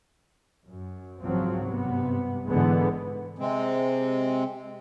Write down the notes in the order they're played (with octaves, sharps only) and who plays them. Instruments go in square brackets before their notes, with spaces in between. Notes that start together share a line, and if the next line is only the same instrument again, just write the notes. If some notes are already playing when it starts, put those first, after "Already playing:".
[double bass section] F#2
G#1 C#2 F3 F#3 C4
G2 C3 B3
G#1 G#2 D3 E3 G#3 B3
[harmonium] C3 G#3 C4